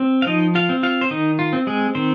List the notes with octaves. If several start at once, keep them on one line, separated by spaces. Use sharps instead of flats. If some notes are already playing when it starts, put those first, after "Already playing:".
Already playing: C4
F5
F3 D#4 D#5
F4 F5
C4
F4 F5
C5
D#3 D#4 D#5
F4
C4
G#3 G#4
D#3 C4 C5